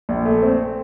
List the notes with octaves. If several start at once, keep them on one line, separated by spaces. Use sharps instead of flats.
A#1
A3
C4